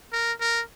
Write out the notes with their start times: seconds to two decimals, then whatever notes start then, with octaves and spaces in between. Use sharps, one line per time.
0.13 A#4
0.41 A#4